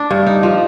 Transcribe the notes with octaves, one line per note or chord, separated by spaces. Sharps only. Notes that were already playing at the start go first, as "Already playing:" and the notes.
Already playing: D4
G2
D#4
F3